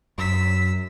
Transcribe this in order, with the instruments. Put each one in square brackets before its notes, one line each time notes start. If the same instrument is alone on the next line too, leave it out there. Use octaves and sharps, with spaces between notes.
[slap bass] F#2 [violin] E6 B6